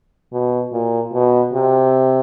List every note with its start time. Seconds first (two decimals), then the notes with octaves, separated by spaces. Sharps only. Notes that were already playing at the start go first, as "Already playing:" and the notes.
0.33 B2
0.72 A#2
1.13 B2
1.53 C3